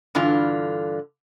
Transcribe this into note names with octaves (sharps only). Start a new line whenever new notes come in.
G2 D3 E3 F4